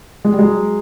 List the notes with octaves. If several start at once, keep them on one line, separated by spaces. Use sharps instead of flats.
G#3
G3
F#3 G#3